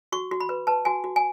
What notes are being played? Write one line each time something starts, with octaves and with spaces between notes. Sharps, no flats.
F#4 C#6
F#4
B5
B4
B4 A5
F#4 G#5
F#4
G#5